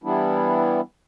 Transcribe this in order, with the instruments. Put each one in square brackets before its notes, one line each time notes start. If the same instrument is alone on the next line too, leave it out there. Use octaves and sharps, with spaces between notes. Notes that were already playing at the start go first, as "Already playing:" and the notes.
[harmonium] E3 G3 B3 D4 E4